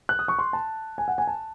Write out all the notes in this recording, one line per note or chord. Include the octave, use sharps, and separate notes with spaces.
F#6
D#6
C#6
C6
A5
G#5
F#5
G#5
A5